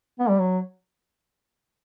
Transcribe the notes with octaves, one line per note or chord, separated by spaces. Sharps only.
B3
G3
F#3